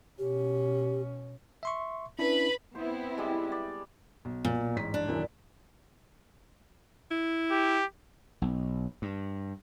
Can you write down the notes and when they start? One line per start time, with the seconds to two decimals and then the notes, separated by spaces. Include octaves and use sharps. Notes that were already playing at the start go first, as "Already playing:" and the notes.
0.19 B2 C#4 G4
1.63 E5 C6 C#6
2.19 C#4 D4 E4 B4 B5
2.75 B3 C4 E4 C5
3.18 G3 G#3
3.52 D5
4.25 B1
4.45 A#2
4.76 A1 G#2 B6
4.94 D4
5.08 D#1 F#2 E3
7.11 E4
7.51 G4
8.42 B1
9.02 G2